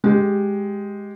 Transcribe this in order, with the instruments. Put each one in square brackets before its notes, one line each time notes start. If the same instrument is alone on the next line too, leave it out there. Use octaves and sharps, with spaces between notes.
[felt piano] G#3 G4